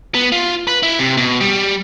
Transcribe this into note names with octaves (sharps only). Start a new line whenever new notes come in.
B3
F4
B4
E4
C3
B2
G3